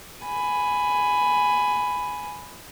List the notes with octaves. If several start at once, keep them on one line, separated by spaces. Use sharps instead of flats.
G#5 B5